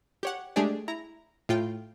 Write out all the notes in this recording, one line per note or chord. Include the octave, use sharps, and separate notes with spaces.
G4 C#5 F#5
G#3 A3 D4 G4 G#4 D5
E4 A#5
A2 F4 G5